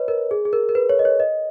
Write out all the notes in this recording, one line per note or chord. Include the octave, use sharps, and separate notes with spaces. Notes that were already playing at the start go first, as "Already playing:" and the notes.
Already playing: B4 C#5 D#5
A#4
G#4
G#4
A#4
A#4
B4
C#5
D#5
C#5
D#5